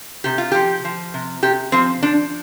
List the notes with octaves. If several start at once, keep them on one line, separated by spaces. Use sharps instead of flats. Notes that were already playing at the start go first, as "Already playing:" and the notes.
C3 G4
F4
F3 G4
F3
C3
C3 G4
F3 C4
F3 D4